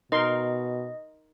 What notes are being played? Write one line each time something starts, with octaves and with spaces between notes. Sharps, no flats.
B2 D#4 A#4 D#5 C6